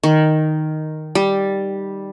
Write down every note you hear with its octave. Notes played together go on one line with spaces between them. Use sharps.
D#3
G3